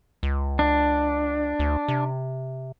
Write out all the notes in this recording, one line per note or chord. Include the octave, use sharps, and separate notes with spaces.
C#2
D4
D2
C3